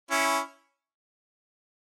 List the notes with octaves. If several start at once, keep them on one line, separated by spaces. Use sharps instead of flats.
C#4 E4